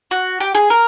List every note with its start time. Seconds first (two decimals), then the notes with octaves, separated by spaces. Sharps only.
0.11 F#4
0.40 G4
0.55 G#4
0.70 A#4